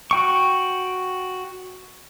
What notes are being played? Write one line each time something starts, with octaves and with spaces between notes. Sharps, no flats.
F#4 G5 C#6